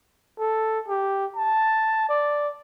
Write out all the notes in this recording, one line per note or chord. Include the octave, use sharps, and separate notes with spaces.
A4
G4
A5
D5